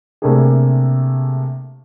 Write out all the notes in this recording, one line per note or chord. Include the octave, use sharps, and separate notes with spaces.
C3 A3 A#3 D4 G4 G#4